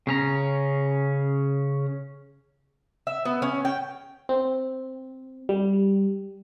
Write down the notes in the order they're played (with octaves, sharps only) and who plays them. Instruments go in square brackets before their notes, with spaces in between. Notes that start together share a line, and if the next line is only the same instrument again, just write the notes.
[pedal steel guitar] C#3 C#4 A#5
[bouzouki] E5
B3
C#4
G5
[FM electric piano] C4
G3